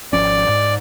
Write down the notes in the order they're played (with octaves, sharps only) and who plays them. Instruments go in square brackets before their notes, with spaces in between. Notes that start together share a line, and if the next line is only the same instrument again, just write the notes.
[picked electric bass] G#1 F3 C#4 [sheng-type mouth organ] D5
[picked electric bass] G#2